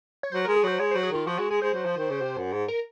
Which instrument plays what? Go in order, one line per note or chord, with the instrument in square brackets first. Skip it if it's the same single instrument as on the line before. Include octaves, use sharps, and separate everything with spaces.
[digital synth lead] C#5
[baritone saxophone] F#3 [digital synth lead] C5
[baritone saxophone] G#3 [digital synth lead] A#4
[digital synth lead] G#4
[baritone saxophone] F#3 [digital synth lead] C5
[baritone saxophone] G#3 [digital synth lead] C#5
[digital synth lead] C5
[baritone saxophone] F#3
[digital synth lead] G#4
[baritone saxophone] D#3 [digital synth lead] F4
[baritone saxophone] F3 [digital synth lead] F#4
[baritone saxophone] G#3 [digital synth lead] F#4
[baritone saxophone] G#3 [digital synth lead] G#4
[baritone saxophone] G#3 [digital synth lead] C5
[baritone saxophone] F#3
F3
D#3
C#3
C3
F#2
G#2
[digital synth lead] A#4